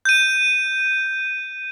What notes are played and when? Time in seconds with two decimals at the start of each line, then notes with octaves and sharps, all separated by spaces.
0.05 G6 D#7